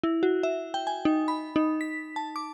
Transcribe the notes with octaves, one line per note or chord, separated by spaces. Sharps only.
E4
F#4
E5
G5
G#5
D#4
B5
D#4
B6
A5
D6